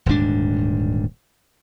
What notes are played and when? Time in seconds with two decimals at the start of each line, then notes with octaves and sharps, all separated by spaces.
0.06 D#1 D2 G#2 D4